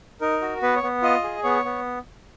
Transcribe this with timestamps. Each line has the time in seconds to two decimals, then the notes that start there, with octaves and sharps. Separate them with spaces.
0.21 D#4 A#4
0.42 F#4
0.62 B3 B4
0.76 C#5
0.83 B3
1.02 F4 D#5
1.23 G#4
1.43 B3 C#5
1.65 B3